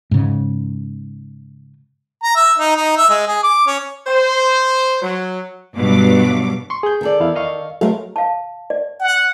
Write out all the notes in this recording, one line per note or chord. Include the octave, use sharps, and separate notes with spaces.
G#2 C#3
A#5
E5
D#4
D#4
E5
G#3
G#4
D6
C#4
C5
F#3
G2 B2 F#3 D6
C6 C#6
G#4 G6
D#3 A4 D5
E2 E4 F5
D#5 F5 C#6
F#3 G#3 A3 A#4 B4 F5
F5 A5
D5
F#5